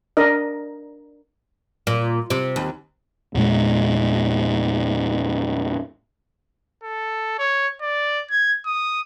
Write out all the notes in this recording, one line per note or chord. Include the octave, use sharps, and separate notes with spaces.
D4 A#4 D#5
A#2
C3
D#2
E2 A#2 G#3
A4
C#5
D5
G#6
D#6